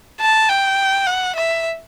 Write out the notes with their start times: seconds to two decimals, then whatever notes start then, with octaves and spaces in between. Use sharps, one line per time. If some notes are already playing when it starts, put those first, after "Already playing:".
0.20 A5
0.49 G5
1.07 F#5
1.35 E5